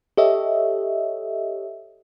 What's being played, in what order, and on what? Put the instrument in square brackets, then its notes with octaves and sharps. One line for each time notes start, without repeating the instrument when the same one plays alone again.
[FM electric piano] G4 A4 C#5 D#5 E5